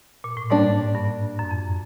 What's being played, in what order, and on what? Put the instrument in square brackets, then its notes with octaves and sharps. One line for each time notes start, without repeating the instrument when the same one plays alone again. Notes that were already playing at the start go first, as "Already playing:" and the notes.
[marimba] A#2
A2
[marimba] G#2 [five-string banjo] G3 A#3 D4
[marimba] G2
F#2
F2